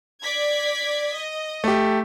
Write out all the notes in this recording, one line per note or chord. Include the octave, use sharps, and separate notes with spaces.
D5 G#6 B6
D#5
A3 G4